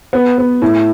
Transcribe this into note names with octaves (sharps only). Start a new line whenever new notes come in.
B3
B3
A2